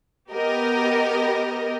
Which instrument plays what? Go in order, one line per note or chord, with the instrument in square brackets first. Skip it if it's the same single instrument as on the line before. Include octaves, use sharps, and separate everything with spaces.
[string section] B3 G4 A#4 D#5